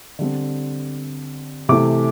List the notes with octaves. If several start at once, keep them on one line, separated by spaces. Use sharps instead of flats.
D3 G3 C4
C3 E3 A3 D6